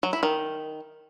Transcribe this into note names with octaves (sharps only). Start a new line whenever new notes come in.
F#3
E4
D#3